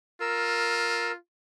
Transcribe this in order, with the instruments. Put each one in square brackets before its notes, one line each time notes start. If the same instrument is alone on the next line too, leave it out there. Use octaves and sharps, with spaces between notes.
[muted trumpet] F4 [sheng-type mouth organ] A#4 E6